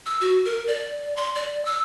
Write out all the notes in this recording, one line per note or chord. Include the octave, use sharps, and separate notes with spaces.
E6
F#4
A#4
D5
C6
D5
E6